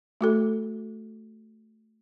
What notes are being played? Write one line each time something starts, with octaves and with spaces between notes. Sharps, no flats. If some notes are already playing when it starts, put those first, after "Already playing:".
A3 F#4 A4